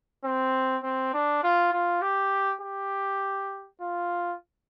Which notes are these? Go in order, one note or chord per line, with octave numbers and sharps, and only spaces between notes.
C4
C4
D4
F4
F4
G4
G4
F4